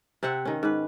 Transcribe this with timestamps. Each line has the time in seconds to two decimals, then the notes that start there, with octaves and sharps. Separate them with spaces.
0.23 C3 C4 E5 F#5
0.45 D#3 C#4
0.63 G#2 B4